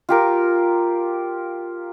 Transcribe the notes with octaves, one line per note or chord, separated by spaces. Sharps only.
F4 G4 A#4